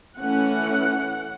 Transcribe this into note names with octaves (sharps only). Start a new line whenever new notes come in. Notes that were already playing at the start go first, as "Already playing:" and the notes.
E3 A3 C#4 F#5